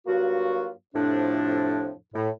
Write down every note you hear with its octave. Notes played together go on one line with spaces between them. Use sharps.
G2 F#3 A#3 F4 F#4
F2 A2 C3 F3 D4
A2